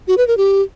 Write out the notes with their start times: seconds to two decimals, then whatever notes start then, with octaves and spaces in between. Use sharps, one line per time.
0.08 F#4
0.18 B4
0.27 A#4
0.37 G4